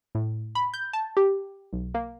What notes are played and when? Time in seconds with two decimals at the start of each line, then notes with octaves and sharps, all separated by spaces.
0.15 A2
0.55 B5
0.74 G6
0.93 A5
1.17 G4
1.73 B1
1.94 A#3